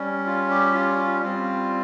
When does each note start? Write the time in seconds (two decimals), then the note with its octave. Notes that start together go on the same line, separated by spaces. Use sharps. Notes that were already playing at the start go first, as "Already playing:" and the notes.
Already playing: G3 C#4
0.26 F4
0.51 G4
0.74 F4
0.98 F4
1.22 G3 C4 F4